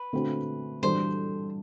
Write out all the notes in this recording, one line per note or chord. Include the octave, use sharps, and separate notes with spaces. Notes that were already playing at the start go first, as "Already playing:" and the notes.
Already playing: B4
D3 A3 C4 F#4
E3 G3 D4 F#4 A4 C5